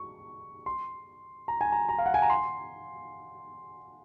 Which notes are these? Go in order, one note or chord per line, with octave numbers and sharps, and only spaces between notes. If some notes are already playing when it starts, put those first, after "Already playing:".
Already playing: C#6
C6
A#5
G#5
A#5
A#5
F5
F#5
G#5
A#5
C6